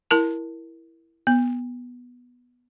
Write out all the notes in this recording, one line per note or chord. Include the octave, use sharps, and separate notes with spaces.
E4 A#4 A5
B3